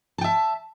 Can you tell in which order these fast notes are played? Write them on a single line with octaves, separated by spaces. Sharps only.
A5 G5 E5